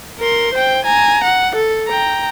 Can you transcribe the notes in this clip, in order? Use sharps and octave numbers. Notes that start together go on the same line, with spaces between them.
A#4 C6
C5 G5
G#5 A#5
F#5
A4
G5 A#5